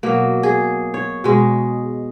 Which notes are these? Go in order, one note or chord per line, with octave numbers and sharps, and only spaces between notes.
B2 F#3 A#3
G#4
C#5
B2 G#3